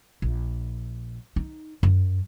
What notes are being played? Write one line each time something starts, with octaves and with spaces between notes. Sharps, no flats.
A#1
D#4
F#2